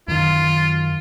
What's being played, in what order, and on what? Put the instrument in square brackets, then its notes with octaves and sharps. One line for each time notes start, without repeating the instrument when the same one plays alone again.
[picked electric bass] F#2 D#3 [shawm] F4